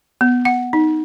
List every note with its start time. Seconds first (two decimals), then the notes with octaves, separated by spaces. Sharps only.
0.21 B3
0.45 F#5
0.73 D#4